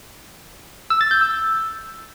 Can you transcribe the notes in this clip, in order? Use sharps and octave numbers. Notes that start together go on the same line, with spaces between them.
E6
A6
G6
E6